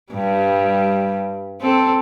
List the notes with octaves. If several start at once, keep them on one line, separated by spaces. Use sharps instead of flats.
G2 G3
C4 A4